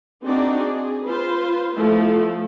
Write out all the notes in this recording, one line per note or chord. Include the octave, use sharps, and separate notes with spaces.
C4 D4 D#4 F#4 G#4 D5
G#4
F4 B4 C5
F3 A3 B3 E4